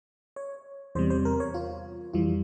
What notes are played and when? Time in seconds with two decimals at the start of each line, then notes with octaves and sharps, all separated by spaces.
0.36 C#5
0.95 E2 C3 G3 C5
1.10 C5
1.25 A#4
1.40 C#5
1.54 F4
2.13 F2 E3 G3 F4